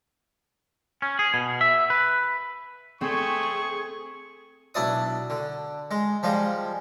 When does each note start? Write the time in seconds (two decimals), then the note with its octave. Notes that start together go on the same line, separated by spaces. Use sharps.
1.02 C#4
1.19 G#4
1.34 B2
1.61 E5
1.90 B4
3.01 A3 C4 G#4 C#6
4.74 B1 D4 E4 D5 D#6
5.30 D3
5.91 G#3
6.23 F3 G3 G#3